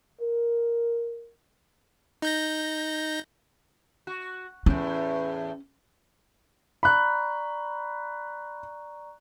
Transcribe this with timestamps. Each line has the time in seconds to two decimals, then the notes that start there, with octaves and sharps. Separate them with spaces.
0.21 A#4
2.22 D#4 G6 A#6
4.07 F#4
4.66 E2 A2 C#4
6.83 D5 A#5 B5 C#6 F#6